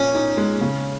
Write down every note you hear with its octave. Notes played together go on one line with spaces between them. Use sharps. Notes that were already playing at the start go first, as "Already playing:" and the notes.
Already playing: A#2 F3 C#4
D#4
G#3
C#3